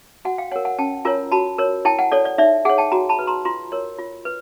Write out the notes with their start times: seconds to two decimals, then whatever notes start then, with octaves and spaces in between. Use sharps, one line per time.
0.25 F#4 F#5 G#5
0.38 F5 G5
0.52 A#4 C#5 F#5 G#5
0.65 F#5 G#5
0.78 C#4 G5 A5
1.05 F4 A#4 C#5 G#5 A#5
1.32 F#4 A5 B5
1.58 A#4 C#5
1.85 E4 G5 A5
1.99 F#5 G#5
2.12 A4 C#5 D5
2.25 D5
2.38 D#4 D5 E5
2.65 G#4 C#5 F#5 G#5
2.78 G5 A5
2.92 F#4 G#5 A#5
3.09 A5 B5
3.19 B4
3.27 A#5 C6
3.45 F4 A#5 C6
3.72 A#4 C#5
3.99 F4
4.25 B4